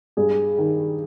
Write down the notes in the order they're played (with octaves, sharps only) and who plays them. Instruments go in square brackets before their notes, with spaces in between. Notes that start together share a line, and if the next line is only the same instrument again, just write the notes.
[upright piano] G2 [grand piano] G#4
[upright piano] D#3